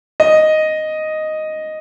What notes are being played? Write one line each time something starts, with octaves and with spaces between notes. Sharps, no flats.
D#5